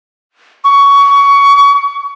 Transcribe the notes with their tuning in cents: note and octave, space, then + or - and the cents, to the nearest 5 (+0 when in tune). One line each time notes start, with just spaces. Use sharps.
C#6 +20